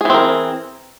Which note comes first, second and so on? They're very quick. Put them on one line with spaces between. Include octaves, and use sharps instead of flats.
G#4 E3 C4 A#4